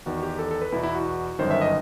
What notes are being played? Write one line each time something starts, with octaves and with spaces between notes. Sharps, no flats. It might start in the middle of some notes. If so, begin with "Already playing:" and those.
E2 D#3 F#4
G4
A4
A4
B4
E2 B2 E4
E4
F#4
G1 F#2 D#3 C5
E5
D#5